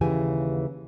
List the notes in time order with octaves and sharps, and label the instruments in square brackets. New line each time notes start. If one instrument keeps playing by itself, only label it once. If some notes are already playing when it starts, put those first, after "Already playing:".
[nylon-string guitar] D#2 C#3 E3 G4 G#5